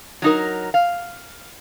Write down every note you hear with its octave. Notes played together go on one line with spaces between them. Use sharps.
F#3 D#4 A#4
F5